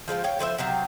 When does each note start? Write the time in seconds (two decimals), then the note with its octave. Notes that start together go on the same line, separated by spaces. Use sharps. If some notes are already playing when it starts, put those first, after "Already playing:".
0.08 F3 G#3 C4 F4
0.24 C#5 F5 G5
0.39 A2 F3 C5 E5
0.58 C3 F3 F#3 C4